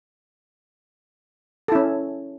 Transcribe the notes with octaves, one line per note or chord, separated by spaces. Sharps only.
C#4 E4 A4